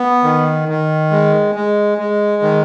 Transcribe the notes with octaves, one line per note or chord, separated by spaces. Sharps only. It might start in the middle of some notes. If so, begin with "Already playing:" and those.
Already playing: B3
D#3
D#3
G#3
G#3
G#3
D#3